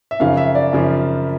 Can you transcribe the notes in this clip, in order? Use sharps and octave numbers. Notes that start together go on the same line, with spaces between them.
E5
F#2 C#3 F3 F5
E5
D5
F#2 C#3 F3